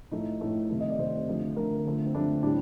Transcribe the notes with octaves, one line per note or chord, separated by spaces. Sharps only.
A2 F3 A3 D#4
A2 F3 A3
C3 D#3 A3
D#5
D5
C3 D#3 A3 C5
D3 F3 A3
D3 F3 A3 A#4
D3 F3 A3
C4
D3 F3 A3 D4
A2 G3 D4